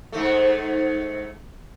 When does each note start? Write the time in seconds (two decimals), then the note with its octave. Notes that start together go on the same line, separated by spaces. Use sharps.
0.12 G#2 A3